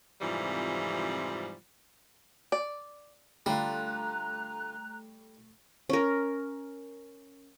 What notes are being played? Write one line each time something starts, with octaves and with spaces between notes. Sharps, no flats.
F2 G#2 C3 E3 F3 G3
D5
D3 G3 A3 F4 A#5 F#6
C#4 A#4